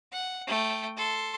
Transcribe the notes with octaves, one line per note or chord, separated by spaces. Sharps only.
F#5
A3 G5
A4 C6